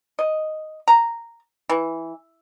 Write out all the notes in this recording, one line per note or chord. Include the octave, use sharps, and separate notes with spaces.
D#5
A#5
E3